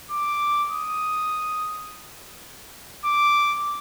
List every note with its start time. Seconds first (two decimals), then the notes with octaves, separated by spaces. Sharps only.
0.11 D6
0.70 D#6
3.05 D6